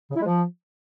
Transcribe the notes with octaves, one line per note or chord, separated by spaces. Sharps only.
C#3
E4
G#3
F3